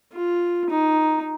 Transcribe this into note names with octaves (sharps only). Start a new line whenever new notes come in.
F4
D#4